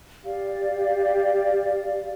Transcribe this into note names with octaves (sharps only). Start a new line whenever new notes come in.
G4 D5 F5